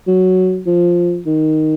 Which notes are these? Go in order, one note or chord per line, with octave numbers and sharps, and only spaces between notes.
F#3
F3
D#3